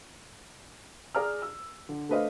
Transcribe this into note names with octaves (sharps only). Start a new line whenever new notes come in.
G#4 D5 A#5 F6
E6
D3
A3 D4 B4 C5 D#5 F5